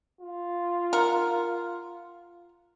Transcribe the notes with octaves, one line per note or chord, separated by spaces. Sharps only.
F4
A#4 F#5